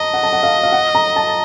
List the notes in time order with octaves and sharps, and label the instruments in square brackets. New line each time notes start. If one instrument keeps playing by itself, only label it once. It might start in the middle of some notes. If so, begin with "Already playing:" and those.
Already playing: [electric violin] D#5 [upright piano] A5 A#5
[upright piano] F#5
A5
F#5
F5
F5
F#5
A#5
A5